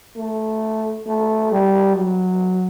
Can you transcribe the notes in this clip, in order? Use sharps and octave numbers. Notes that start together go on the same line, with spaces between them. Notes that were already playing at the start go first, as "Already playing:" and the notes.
A3
A3
G3
F#3